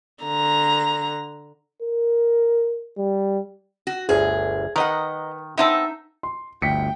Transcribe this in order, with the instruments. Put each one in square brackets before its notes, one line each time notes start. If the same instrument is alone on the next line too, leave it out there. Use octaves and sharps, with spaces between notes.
[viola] D3 A#5
[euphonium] A#4
G3
[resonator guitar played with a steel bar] F#4
[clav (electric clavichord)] G1 D2 [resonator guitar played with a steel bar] G#4
[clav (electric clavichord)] D#3 [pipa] A#4 D#5 [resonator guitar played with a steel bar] B4 F#5
[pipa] B3 C4 A4 [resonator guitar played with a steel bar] D#4 E5
[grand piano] C6
[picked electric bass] G1 D2 [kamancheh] G5 [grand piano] B6 C#7